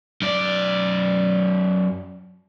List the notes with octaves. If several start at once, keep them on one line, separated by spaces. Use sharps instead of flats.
F#2 D5